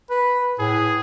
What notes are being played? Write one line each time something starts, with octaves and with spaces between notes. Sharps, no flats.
B4
A2 G#4